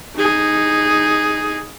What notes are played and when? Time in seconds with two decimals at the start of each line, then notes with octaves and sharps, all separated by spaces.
0.16 D#4 G#4